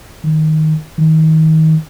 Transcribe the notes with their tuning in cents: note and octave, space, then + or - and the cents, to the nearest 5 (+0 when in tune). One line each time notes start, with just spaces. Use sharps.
D#3 +5
D#3 +30